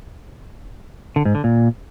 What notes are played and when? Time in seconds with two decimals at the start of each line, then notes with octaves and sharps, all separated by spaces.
1.16 D3
1.25 G#2
1.35 D3
1.44 A#2